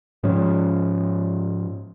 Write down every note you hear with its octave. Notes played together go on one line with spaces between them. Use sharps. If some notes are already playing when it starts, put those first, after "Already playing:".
G#2 F3 C#4